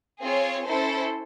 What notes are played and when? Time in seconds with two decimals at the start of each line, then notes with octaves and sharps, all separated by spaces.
0.20 C4 F4 G#4 C#5
0.65 C#4 E4 A4 C5